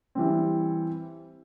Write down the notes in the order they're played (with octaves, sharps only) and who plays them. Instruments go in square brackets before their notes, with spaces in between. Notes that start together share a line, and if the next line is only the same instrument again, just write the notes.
[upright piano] E3 G3 C4